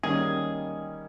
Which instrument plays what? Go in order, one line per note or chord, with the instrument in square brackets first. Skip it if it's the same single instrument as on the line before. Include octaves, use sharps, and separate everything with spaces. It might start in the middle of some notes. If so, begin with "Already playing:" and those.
[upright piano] D#3 G3 A#3 C#4 [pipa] G#4